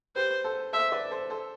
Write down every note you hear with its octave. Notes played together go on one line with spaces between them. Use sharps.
G4 B4 C5
A4 C5
A4 C5 E5
B4 D5
A4 C5
A4 C5